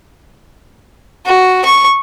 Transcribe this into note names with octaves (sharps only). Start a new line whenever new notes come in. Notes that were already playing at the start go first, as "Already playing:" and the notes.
F#4
C#6